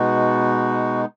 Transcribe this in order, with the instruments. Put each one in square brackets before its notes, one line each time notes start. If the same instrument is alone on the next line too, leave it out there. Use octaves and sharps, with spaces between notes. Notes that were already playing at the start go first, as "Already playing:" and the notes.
Already playing: [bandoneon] B2 G#3 B3 D#4 F#4